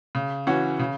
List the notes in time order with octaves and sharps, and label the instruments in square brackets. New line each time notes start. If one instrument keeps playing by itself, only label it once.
[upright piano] C#3
E3 C#4 F#4
C#3